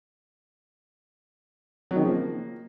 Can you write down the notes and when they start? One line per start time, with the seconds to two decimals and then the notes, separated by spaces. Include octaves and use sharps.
1.91 F#3
1.96 D#3
2.01 C#3
2.06 F3
2.11 A#3